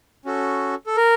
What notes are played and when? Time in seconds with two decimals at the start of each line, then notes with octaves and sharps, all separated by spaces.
0.25 C#4 F#4 A4
0.86 A4
0.97 A#4